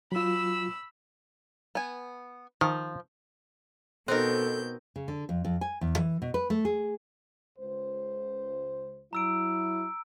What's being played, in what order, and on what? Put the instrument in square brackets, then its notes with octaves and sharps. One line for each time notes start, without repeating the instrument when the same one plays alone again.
[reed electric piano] F#3 F4 [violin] B5 E6
[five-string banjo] B3 G#5
[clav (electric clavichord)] D#3 [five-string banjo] F3
[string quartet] B2 G6 [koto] C4 D#4 A#4 [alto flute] A4 [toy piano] C5 D#5
[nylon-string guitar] C#3
D3
F2
F2
G#5
E2
E3
B2
B4
A3
G#4
[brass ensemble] C#2 C5
[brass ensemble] F#3 E4 [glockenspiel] A#5 E6 D7